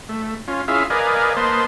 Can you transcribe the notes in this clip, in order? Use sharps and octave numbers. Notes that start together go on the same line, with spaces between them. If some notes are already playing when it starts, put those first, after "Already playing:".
A3
C#4 F4
C#4 E4 F4 G#4 E5 F5
A#4 B4 D5 D#5 F5 G#5
A#3 B4 C5 D#5 A5 C6